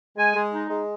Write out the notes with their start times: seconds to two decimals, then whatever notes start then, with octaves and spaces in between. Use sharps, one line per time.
0.17 G#3 G#5
0.35 G#3
0.52 D#4
0.69 G#3